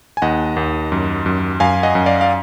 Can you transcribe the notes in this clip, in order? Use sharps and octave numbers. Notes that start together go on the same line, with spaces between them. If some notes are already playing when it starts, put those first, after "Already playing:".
G#5
D#2 D#5 F#5
D#2
F#2
F#2
F#2 F5 G#5
D#5 F#5
F#2
D5 F5
F5